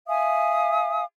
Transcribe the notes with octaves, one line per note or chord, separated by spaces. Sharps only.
E5 F5 G#5 D#6